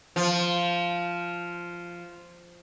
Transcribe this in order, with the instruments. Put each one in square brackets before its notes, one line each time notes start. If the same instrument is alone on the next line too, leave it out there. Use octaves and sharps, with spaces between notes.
[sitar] F3